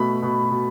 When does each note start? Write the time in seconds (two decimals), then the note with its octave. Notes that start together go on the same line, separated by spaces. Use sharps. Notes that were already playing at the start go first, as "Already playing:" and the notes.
Already playing: B2 A3 B5
0.22 B2
0.51 B2